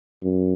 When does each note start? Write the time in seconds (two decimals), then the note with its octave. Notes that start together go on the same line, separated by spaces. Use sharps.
0.23 F#2